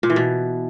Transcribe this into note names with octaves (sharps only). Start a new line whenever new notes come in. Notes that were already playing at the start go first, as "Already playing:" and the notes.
A#2
E3
B2